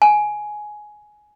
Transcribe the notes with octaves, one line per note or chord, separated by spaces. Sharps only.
G#5